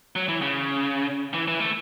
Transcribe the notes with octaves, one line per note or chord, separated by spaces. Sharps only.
F#3
E3
C#3
E3
E3
A3